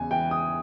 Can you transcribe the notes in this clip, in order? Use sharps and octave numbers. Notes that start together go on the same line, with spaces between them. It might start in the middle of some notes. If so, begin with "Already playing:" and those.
Already playing: E2 C#3 G#5
E3 G5
D#6